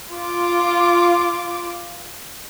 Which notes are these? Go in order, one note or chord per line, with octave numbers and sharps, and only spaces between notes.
F4 D6